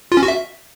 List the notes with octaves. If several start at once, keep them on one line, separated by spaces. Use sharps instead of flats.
F4
C#4
F#4
E5